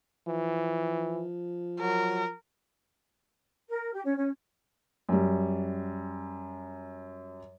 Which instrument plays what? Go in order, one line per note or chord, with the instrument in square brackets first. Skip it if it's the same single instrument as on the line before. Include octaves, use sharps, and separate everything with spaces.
[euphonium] E3 [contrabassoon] F3
[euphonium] F#3 [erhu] A#4
[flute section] A#4
G4
C#4
C#4
[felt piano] F#2 G3